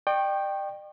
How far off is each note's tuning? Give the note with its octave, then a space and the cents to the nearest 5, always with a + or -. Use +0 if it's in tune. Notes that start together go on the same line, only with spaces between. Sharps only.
D5 +45 G5 +0 C#6 -30